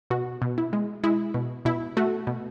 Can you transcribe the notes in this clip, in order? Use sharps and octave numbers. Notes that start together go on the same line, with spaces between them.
B2 F#4
B2
E4
G#3
G#3 E4
B2
B2 E4
A3 F#4
B2